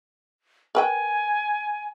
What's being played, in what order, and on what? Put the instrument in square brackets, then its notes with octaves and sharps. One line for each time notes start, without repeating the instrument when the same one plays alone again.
[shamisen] A#4 B4 G5 [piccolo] G#5